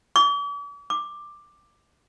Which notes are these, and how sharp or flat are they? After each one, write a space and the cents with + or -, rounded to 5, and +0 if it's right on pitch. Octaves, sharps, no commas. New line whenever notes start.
D6 -45
D6 +10